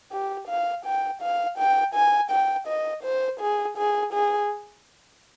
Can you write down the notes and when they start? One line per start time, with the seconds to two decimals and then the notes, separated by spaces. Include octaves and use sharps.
0.12 G4
0.49 F5
0.85 G5
1.22 F5
1.58 G5
1.95 G#5
2.31 G5
2.68 D#5
3.03 C5
3.40 G#4
3.77 G#4
4.13 G#4